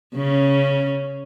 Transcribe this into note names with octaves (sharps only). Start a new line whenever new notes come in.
C#3 C#4